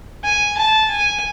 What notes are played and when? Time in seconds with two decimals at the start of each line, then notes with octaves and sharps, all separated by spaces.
0.24 G#5
0.58 A5
0.91 G#5